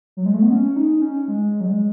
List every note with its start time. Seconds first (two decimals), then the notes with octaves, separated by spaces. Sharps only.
0.17 F#3
0.26 G#3
0.34 A3
0.42 B3
0.51 C#4
0.64 C#4
0.76 D#4
1.02 C#4
1.28 G#3
1.60 F#3
1.66 G#3